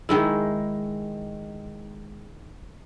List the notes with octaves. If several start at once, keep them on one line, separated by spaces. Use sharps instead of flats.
D#3 G#3 E4